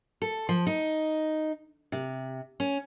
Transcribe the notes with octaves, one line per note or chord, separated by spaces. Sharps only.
A4
F3
D#4
C3
C#4